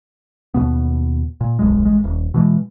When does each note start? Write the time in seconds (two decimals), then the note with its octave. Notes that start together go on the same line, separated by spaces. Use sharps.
0.54 D#2 G#2 B2 B3
1.41 A#2
1.59 D1 B1 F#2 G#3
1.82 A1 G#3
2.04 D#1
2.34 B2 E3 G#3